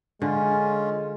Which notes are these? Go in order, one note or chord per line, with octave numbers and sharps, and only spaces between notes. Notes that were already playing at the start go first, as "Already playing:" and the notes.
D3 G#3 C#4 F4